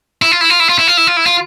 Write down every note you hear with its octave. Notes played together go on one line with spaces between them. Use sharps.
E4
F4
E4
F4
E4
F4
E4
F4
E4
F4
E4
F4